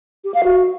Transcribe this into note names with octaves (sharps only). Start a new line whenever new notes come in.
G4
F5
F#4